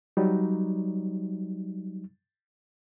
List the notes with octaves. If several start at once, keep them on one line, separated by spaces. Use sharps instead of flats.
F#3 G3 D#4